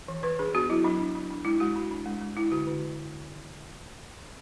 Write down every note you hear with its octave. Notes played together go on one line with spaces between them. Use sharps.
E3
E3 B4
D4 G#4
B3 F#4
F#3 E4
F#3 D4
D4
D4
D4
G#3 E4
G#3 F#4
D4
D4
G#3
G#3
G#3 E4
D3 F#4
D3